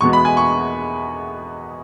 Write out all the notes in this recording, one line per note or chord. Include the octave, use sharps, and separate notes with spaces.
E2 B2 G#3 B3 C#6
B5
G#5
C#6